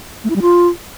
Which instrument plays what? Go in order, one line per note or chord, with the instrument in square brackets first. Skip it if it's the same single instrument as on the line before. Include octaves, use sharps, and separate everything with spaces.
[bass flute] A3
E4
G3
F4